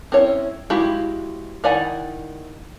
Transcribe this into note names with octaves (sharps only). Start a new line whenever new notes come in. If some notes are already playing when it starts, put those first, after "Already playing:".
C4 C#4 E4 C#5
G#3 E4 F#4 G4 F5
D#3 E4 D5 F#5 G#5